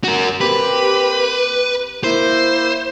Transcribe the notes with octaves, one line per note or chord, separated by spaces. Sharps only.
F#4 A#4
A#3 C4 G4 B4
A#3 E4 C5